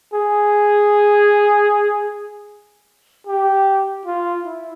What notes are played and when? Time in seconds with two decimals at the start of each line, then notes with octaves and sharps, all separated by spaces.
0.14 G#4
3.27 G4
4.06 F4
4.45 E4